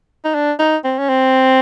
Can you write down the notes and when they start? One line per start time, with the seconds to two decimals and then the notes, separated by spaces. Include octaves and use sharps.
0.24 D#4
0.35 D4
0.59 D#4
0.84 C4
0.99 C#4
1.09 C4